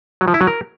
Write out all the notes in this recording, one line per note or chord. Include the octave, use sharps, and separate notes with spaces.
F#3
F3
E4
F#3
A#4